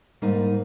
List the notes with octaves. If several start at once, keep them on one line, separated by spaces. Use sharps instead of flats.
G#2 G3 A#3 D#4